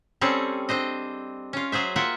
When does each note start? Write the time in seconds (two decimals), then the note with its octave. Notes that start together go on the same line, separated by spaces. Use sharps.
0.21 G3 C4 C#4 G#4 A4
0.69 C4 D4 C5 D#5
1.53 C#4 F4
1.72 F#3 G#4 C5 E5
1.96 A#3 F4 E5 F#5 G5